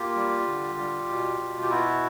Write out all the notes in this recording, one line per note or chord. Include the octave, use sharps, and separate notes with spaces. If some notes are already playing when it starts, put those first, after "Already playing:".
Already playing: A#3 F4 G4
G3
D3
G3
B2
B2
G4
B3 E4 F#4